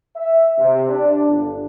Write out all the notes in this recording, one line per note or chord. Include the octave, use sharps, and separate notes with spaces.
E5
C3
D4
G1